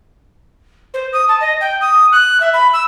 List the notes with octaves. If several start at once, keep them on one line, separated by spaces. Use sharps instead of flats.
C5
D#6
A5
D#5
G5
D#6
F#6
E5
B5
E6